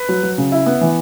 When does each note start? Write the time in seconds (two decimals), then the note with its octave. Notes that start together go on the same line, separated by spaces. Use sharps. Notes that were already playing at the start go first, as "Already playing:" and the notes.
Already playing: B4
0.09 F#3
0.23 F#3
0.38 C#3
0.52 E4
0.66 B3
0.81 E3